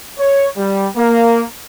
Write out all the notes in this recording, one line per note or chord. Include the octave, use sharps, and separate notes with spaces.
C#5
G3
A#3